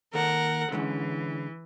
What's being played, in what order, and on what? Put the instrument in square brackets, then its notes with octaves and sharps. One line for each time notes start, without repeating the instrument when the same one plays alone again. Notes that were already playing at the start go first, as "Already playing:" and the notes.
[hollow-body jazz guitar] D#2 D#3 A4 [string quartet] A#4 F#5
[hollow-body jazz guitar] D3 G#3 C#4 [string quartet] E3